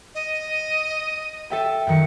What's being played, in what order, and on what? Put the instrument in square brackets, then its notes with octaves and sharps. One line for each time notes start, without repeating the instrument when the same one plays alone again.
[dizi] D#5
[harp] A4 E5 G5
F#2 D#3 C#7